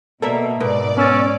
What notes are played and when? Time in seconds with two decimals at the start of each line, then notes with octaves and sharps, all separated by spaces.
0.22 B2 A#3 A4 E5
0.60 G#2 B2 A#4 D5
0.97 B3 C#4 E6 A6